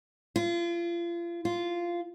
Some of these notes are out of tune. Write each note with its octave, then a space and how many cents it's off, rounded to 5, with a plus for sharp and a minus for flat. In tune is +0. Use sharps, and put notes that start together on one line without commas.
F4 -35
F4 -10